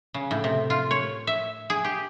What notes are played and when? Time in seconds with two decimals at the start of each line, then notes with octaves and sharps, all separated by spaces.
0.14 C#3
0.31 A2
0.44 C3
0.70 F4
0.91 C#5
1.27 E5
1.70 G#4
1.85 G4